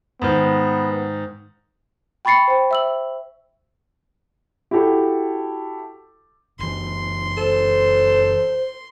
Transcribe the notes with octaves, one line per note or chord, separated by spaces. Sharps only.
G#2 D#3 B3
G5 B5 C#6 A6 C7 C#7
C5 G5
E5 E6 F#7
E4 F#4 G4 A4
F#1 E3 C6
A4 C5